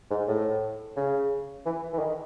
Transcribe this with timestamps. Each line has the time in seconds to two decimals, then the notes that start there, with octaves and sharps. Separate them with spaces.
0.11 G#2
0.28 A2
0.96 C#3
1.66 E3
1.93 E3
1.99 D#3